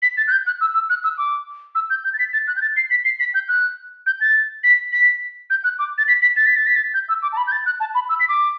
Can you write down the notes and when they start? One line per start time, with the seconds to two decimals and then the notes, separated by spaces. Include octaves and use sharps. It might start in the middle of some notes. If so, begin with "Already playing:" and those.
0.02 B6
0.17 A6
0.27 F#6
0.32 G6
0.46 F#6
0.61 E6
0.74 E6
0.90 F#6
1.04 E6
1.18 D6
1.75 E6
1.90 G6
2.04 G6
2.13 A6
2.19 B6
2.33 A6
2.47 F#6
2.56 G6
2.62 A6
2.76 C7
2.90 B6
3.05 C7
3.20 B6
3.34 G6
3.48 F#6
4.06 G6
4.21 A6
4.64 B6
4.92 B6
5.50 G6
5.64 F#6
5.79 D6
5.98 A6
6.08 B6
6.22 B6
6.36 A6
6.46 B6
6.56 A6
6.66 B6
6.76 A6
6.94 G6
7.09 E6
7.22 D6
7.33 A5
7.37 B5
7.47 G6
7.52 A6
7.66 F#6
7.80 A5
7.95 B5
8.09 E6
8.20 B6
8.29 D6